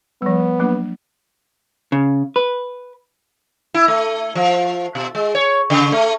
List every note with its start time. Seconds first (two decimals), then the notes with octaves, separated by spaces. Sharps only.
0.22 F3 G3 B3
0.59 F#3 A#3 D4
1.92 C#3
2.36 B4
3.74 E4
3.88 A3
4.35 F3
4.95 B2
5.15 G#3
5.35 C#5
5.70 C#3
5.92 A3